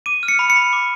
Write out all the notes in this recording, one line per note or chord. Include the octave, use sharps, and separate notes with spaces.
D6 D#7
F6
C#7
B5
C#7
B5
D6